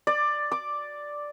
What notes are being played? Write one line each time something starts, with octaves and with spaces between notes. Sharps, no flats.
D5
D6